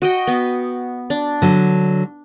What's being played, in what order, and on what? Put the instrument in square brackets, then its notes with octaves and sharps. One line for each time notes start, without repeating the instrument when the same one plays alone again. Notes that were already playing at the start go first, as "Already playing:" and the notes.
[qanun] F#4 D#5 G5
B3
D4
[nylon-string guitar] D3 F#3